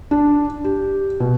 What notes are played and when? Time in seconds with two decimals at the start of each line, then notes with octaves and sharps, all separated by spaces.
0.11 D4
0.64 G4
1.20 B2